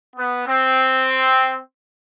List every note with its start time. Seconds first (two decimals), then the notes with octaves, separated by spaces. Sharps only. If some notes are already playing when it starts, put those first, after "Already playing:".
0.16 B3
0.47 C4